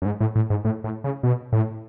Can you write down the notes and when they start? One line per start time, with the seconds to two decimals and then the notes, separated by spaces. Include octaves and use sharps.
0.02 F#2
0.05 G#2
0.20 A2
0.35 A2
0.50 G#2
0.65 A2
0.84 A2
1.04 C#3
1.23 B2
1.52 A2